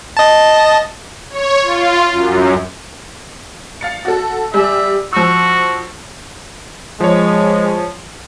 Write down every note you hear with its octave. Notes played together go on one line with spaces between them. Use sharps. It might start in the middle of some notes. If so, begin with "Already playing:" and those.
D#5 A5
C#5
F4
F#2
F5 A6 C#7
F#4 A4
G3 G#4 D5 E5
F3 F#4 E6
F3 G#3 C#5